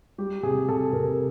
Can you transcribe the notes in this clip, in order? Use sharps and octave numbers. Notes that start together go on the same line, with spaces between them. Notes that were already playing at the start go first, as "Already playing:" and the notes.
G3 G4
C3 G#4
C3 A4
C3 A#4